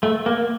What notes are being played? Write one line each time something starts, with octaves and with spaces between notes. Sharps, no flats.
A3
A#3